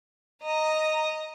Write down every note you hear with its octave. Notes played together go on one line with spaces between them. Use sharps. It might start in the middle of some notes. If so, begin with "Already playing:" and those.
D#5 A#5